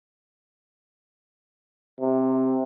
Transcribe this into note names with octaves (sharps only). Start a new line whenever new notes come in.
C3